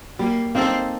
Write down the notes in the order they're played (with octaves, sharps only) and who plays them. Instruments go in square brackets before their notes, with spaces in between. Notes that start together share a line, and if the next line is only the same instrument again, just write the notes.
[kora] G3 [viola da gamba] A#3
[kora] A#3 D#4 A4 [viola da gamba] C4